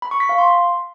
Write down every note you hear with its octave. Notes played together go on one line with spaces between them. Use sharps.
B5
C#6
B6
F5
C6